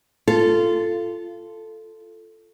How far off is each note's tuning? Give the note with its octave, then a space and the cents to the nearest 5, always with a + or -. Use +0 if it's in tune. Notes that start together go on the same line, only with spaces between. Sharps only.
F4 -15 A4 +0